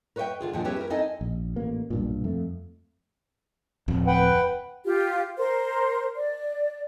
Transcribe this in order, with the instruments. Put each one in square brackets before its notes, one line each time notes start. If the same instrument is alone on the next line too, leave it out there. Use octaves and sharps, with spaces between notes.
[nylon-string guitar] A#4 B4 C#5 D#5 E5 G5
D3 F4 G#4
D#2 A#2 D3 F3 G5
C4 E4 G4 G#4 B4 C#5
E4 A#4
C4 D#4 E4 A4 D#5 G#5
[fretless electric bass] A#1
A1 A#3
B1 G2 A#2
F2 A3
[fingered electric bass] D1 F2
[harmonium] B4 F#5 G5
[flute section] F4 G4
A#4 C5 C6
D5